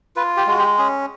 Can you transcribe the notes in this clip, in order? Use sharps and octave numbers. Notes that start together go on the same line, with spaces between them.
F4 B4
G4
G#3 F#4
G4
C#4 G#4